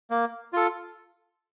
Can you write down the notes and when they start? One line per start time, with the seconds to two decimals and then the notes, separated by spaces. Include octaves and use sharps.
0.10 A#3
0.53 F4 A4